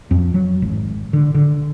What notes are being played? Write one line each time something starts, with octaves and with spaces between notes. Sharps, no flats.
F2
F#3
G#1
D3
D3